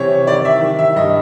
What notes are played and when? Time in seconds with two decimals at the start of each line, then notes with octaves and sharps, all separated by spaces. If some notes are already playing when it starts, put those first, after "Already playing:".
Already playing: C3 E3 G3 C5 C#5
0.27 D#3 D5
0.45 E5
0.61 D#3
0.79 E5
0.96 G2 D#5